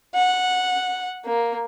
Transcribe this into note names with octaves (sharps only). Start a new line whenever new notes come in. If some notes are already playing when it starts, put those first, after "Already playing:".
F#5
A#3